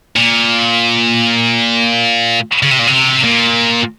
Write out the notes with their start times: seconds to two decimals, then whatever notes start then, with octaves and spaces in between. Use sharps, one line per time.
0.16 A#2
2.63 C#3
2.71 C3
2.79 A#2
2.87 C3
3.24 A#2